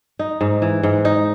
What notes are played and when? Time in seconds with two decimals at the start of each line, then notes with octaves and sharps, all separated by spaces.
0.19 D#4
0.41 G#2
0.62 E3
0.83 G#2
1.05 D#4